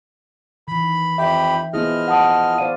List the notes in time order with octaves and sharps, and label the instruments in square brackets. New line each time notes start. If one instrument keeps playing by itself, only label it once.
[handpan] D#3 E3 [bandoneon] B5
[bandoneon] F2 G4 B5 [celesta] E5 G5
[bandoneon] F3 D#5 F6 [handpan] B3 E4 G#4
[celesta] F#5 A5 D#6
[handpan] C5 D5 F5 [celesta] D#7